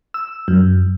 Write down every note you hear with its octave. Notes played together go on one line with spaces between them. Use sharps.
E6
F#2